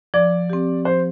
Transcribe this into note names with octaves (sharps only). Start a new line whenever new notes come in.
F3 D5
C4 G4
F3 C5